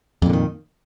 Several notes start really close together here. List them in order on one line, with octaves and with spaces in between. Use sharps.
F2 A#2 D3 D#3